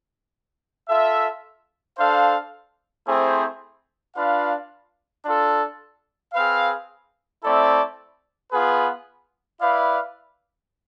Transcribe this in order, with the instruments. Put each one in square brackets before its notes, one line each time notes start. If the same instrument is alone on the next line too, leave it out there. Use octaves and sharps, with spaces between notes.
[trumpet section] F4 A4 E5
D4 A4 C5 F5
A3 C4 E4 G#4 C5
D4 F4 B4 F5
D4 F4 A4
C4 G#4 B4 F5
A3 C4 E4 A4 D5
B3 F4 G#4 B4
E4 B4 D5 F5